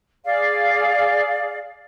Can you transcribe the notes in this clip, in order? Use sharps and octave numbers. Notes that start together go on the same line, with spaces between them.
G#4 D5 F5